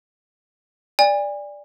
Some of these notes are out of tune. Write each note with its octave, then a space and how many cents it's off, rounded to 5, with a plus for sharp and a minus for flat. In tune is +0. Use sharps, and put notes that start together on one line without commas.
D5 +0 G#5 -35